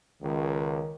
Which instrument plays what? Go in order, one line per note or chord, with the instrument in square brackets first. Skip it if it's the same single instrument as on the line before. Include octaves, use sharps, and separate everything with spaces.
[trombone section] C#2 [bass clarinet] D#3